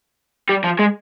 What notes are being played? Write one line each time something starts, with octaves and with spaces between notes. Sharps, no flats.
G3
F3
G#3